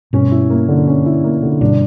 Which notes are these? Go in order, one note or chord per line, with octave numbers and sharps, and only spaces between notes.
G2 B2 C#4
E4
A#3
D3
C#4
E4
A#3
D3
G2 B2 D4